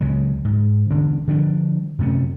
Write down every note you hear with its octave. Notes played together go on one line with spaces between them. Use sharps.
C#2 C#3 F#3 G#3
G#2
E1 D3 D4
D3 F3 G3 D4
F#2 C3 A3 C#4